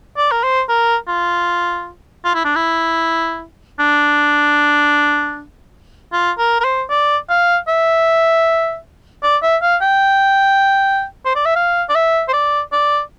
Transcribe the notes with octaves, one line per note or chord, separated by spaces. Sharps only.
D5
A#4
C5
A#4
F4
F4
E4
D4
E4
D4
F4
A#4
A#4
C5
D5
F5
E5
D5
E5
F5
G5
C5
D5
E5
F5
D5
E5
C5
D5
D5